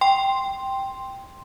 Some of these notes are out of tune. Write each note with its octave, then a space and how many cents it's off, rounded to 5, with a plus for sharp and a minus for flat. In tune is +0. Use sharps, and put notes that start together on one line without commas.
G5 +0 C6 +0